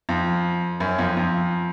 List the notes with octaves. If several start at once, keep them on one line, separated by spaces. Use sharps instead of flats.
F2
F#2
F2
F2